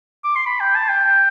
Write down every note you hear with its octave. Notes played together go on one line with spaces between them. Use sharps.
D6
C6
B5
G5
A5
G5